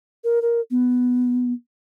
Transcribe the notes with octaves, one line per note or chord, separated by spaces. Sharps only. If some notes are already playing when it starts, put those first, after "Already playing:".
A#4
A#4
B3